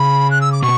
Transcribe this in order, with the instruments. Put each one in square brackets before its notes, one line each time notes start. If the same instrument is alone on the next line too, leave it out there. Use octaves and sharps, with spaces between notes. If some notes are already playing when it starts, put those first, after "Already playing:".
Already playing: [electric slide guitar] C#3 [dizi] B5
[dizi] F#6
E6
D6
[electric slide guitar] B2 [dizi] C#6